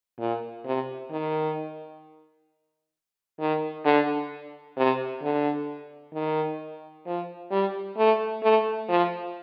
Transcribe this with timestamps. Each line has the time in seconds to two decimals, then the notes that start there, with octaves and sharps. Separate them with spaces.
0.19 A#2
0.66 C3
1.11 D#3
3.40 D#3
3.85 D3
4.77 C3
5.22 D3
6.14 D#3
7.06 F3
7.51 G3
7.98 A3
8.43 A3
8.89 F3